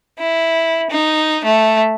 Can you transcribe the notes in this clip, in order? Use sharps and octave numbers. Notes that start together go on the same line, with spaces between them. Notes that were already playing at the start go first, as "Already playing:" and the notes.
E4
D#4
A3